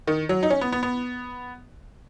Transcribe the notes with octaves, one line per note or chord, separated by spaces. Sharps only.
D#3
F#3
D#4
C#4
B3
B3
B3